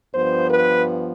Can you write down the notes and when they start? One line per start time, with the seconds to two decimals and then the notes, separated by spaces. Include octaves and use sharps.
0.14 G2 F3 B3 C5
0.51 B4